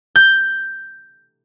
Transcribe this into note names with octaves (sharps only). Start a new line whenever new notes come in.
G6